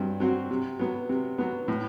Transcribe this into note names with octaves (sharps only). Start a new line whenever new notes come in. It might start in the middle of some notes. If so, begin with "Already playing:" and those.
Already playing: G2 F#3 C4
F#3 C4 F#4
C3
F#3 B3
C3
F#3 B3
A2